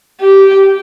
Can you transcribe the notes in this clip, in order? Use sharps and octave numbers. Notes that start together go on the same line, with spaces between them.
G4